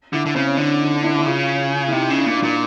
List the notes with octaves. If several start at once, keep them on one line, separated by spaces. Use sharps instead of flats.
D3 E4
D3
C#3 C4
C#4
D3 D4
D#4
E4
E4
C#3 F4
E4
C3 D#4
C#3
D4
A#2
D4
A#2